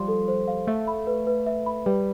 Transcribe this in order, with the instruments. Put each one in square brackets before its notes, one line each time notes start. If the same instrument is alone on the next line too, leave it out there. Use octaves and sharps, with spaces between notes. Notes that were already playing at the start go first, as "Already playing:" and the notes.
Already playing: [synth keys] F3 G3 [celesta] C5 F5 C6
[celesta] A4
C5
F5
[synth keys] A3 [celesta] E5
[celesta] B5
B4
B4
E5
B5
[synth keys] G3 [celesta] B4